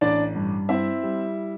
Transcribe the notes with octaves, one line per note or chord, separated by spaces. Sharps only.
A1 D4 D5
G2
C4 E4 E5
G3